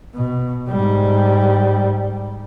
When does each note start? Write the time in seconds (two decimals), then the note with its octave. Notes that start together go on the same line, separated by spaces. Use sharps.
0.15 B2
0.69 G#2 G3